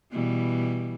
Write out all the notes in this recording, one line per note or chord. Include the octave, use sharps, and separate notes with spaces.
B2 E3 G3